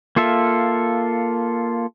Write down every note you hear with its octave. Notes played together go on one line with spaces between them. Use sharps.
A#3 F4 A4 E5